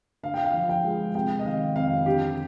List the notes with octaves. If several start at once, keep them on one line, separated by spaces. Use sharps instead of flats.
D3 F5
G5
F5
F3
G5
G#3
C3 G5
D#5
D#3 F5
F2 F5
D3 G4